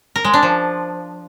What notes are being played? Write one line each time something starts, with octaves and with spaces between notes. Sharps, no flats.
A#4
G#3
D4
F3